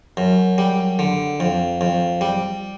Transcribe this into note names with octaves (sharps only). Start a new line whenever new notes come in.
F#2
G3
D3
F2
F2
G3